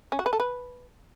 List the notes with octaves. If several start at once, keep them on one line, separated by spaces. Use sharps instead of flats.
C#4
F#4
B4
A4
B4